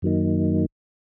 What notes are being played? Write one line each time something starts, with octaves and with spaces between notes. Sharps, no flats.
F#2 D#3 F#3 A#3 D#4